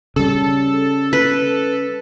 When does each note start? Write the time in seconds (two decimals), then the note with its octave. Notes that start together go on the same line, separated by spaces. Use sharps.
0.16 C#3 G3 A4
1.13 B4